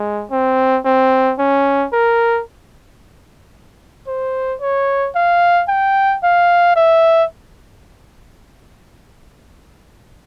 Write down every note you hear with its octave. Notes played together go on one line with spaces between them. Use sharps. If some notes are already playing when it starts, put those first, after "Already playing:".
Already playing: G#3
C4
C4
C#4
A#4
C5
C#5
F5
G5
F5
E5